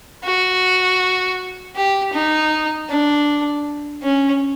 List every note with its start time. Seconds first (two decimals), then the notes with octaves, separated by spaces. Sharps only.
0.25 F#4
1.76 G4
2.14 D#4
2.90 D4
4.03 C#4